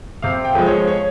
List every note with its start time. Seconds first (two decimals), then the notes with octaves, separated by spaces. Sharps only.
0.22 C3 F5
0.45 G5
0.55 F3 G#3
0.66 C#5
0.88 C#5